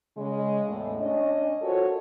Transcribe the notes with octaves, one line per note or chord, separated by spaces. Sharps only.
C#3 G#3
E2 A2
C#4 D4 C#5 D#5
F4 F#4 A4 A#4 C5 C#5